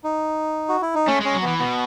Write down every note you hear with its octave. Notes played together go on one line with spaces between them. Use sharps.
D#4
F#4
E4
D#4
A3 C#4
G#3 C#4
F#3
E3 B3
B2 B3